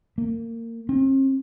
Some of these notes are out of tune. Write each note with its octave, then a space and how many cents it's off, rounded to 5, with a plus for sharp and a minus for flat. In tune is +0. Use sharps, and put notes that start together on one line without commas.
A#3 -25
C4 +45